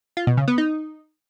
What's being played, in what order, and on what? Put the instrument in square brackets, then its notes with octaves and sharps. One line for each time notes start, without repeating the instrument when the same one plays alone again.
[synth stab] F4
B2
C#3
B3
D#4